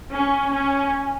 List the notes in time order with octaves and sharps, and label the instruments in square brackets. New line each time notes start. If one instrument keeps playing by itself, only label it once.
[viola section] C#4 [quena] G#5
[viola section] C#4